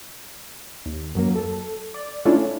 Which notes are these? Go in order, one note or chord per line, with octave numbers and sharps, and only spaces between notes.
D#2
F#2 F#3 A#3
A4
D5
A3 C#4 D4 E4 F4 A4
C#4